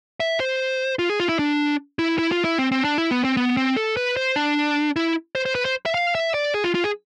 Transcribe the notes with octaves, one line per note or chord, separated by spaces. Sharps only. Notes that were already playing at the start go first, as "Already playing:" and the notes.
E5
C5
F4
G#4
F4
E4
D4
E4
E4
F4
E4
C4
C4
D4
E4
B3
C4
B3
C4
A4
B4
C5
D4
E4
C5
C5
B4
C5
E5
F5
E5
D5
G#4
F4
F4
G#4